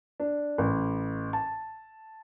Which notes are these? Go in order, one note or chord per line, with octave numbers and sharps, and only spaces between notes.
D4
A1
A5